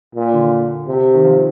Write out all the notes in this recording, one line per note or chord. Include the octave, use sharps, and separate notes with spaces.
A#2
D3
C3
D#3
F3